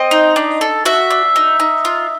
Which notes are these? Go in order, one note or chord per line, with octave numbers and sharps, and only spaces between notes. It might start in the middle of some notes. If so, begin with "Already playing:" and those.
Already playing: C4 D#5
D#4
D4
A4
F#4 E5
D4
D#4
D#4
F4